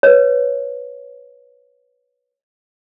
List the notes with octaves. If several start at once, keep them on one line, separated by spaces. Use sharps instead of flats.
B4 C#5